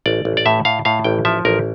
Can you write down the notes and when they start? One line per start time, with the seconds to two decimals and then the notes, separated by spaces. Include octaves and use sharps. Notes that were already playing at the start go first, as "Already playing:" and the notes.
0.06 A1 D5
0.25 A1
0.37 D5
0.46 A2 E5
0.65 A2 F5
0.85 A2 F5
1.04 A1 G5
1.25 F3 E5
1.45 A1 A#4